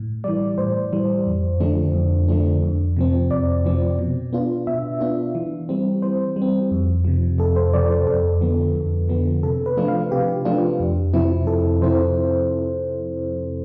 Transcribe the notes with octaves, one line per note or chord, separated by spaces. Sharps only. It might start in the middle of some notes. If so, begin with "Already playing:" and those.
Already playing: A2
E3 G3 D5
A2 C5
E3 G3
F2
D3 F3 A3 D4
F2
D3 F3 A3 D4
F2
C3 F3 C4
F2 D5
C3 F3 C4
B2
B3 D4 F4
B2 E5
B3 D4 F4
E3
G3 C4
E3 C5
G3
C4
F2
C3 F3
F2 A4
C5
C3 F3 D5
C5
F2 A4
D3 F3 B3
F2
D3 F3 B3
C3 A4
B4
F3 A3 D4 F4
F5
C3 G4
F3 A3 D4 F4
F2
C3 F3 C4 E4
F2 A4
C3 F3 C4 E4 C5